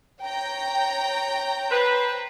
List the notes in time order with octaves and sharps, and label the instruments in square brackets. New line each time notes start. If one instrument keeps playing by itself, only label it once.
[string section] C#5 G5 A#5
[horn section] B4 C5